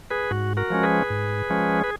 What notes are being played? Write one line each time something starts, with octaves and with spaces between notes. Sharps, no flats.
G#4 B4
G#2 F#4
F#4 A#4
F3 G#3 C#4
G#4 B4
G#2
F3 G#3 C#4
B4